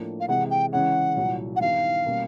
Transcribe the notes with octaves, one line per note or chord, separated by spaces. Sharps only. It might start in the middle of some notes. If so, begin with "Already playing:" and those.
Already playing: A2 F3 A#3 D4
F5
C3 E3 G#3 F#5
G5
C#3 E3 G#3 C#4 F#5
C2 A#2 F#3
F#5
G2 D#3 G3 B3 E4 F5
B2 G3 A#3 C#4